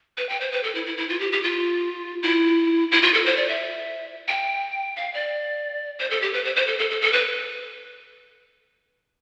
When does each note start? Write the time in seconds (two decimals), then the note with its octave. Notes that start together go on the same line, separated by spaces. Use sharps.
0.17 B4
0.29 G5
0.41 C5
0.52 B4
0.63 A4
0.75 E4
0.86 E4
0.97 E4
1.09 F4
1.20 G4
1.32 G4
1.43 F4
2.23 E4
2.92 E4
3.02 F4
3.14 A4
3.25 C5
3.37 D5
3.49 E5
4.28 G5
4.96 F5
5.14 D5
5.99 C5
6.11 A4
6.22 G4
6.33 B4
6.44 C5
6.56 C5
6.67 A4
6.79 A4
6.90 A4
7.02 A4
7.13 B4